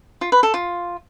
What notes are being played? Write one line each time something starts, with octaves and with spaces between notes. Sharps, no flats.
F4
B4
A4
F4